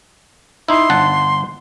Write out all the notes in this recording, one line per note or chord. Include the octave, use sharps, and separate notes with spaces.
D#4 E4 C6
G1 F#5 A5